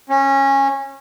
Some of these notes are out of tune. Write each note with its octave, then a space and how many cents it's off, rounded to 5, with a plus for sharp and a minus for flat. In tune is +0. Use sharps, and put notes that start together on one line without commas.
C#4 -20